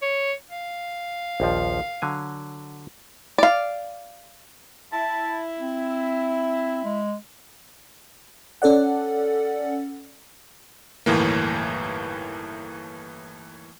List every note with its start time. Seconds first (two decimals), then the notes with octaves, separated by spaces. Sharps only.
0.02 C#5
0.50 F5
1.40 A#1 D#2 F3
2.02 D3 F#3 G#5
3.38 D5 F5
4.93 E4 A5
5.59 C4
6.85 G#3
8.62 C#4 A4 D5 F#5
11.06 G1 D#2 A2 E3 A#3